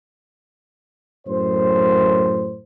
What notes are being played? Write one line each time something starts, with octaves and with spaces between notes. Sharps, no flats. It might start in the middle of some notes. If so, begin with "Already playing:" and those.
F#2 A2 C5